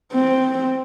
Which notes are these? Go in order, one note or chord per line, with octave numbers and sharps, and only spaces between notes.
C4